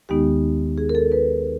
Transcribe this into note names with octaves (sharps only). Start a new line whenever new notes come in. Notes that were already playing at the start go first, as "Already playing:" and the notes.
D#2 D#3 G#3 B3 D#4 G4
G#4
A#4
A4
B4